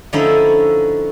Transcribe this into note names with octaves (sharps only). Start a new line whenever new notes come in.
D3 F3 A3 C#4 D#4 E4